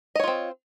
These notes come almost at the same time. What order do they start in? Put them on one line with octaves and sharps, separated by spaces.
D#5 C#5 F4 C4